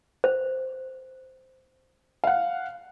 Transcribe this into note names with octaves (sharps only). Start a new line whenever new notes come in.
C5
F5 F#5